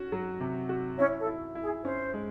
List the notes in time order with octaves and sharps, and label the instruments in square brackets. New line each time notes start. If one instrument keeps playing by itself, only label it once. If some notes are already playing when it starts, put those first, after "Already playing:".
Already playing: [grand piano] C#4 F#4
F#3
C3
F#4
[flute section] C#4 C#5 [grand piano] E4
[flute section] A4
[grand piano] E4
E4
[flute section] G#4
[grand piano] C#4 [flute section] C5
[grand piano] G#3